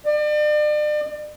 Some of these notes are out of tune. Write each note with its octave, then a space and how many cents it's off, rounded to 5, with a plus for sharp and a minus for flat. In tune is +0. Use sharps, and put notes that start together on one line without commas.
D5 +35